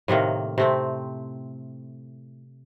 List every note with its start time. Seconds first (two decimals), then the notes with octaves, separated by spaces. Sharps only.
0.08 A2 C3 D#3 A#3
0.58 C3 A3 C4